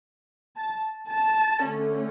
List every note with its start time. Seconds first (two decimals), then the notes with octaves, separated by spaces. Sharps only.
0.57 A5
1.10 A5
1.63 D3 A3 C#4